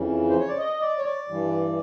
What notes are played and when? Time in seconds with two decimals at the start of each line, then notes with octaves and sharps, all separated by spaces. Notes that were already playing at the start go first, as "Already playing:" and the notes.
Already playing: F2 C#3 E3
0.30 C5
0.39 C#5
0.48 D5
0.58 D#5
0.81 D5
0.98 C#5
1.05 D5
1.28 G2 E3